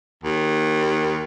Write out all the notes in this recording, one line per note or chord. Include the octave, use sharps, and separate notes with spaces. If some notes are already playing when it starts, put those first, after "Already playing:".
D#2